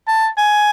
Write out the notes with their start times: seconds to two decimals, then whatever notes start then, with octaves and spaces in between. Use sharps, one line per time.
0.08 A5
0.37 G#5